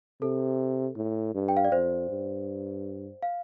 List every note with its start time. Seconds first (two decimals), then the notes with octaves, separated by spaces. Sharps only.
0.22 C3 A4
0.96 A2
1.34 G2
1.48 G5
1.57 F5
1.64 D5
1.72 F2 C5
2.09 G2
3.23 F5